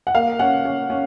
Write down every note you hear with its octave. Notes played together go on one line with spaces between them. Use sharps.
F#5
A#3 F5
C#4 F#5
C#4
C#4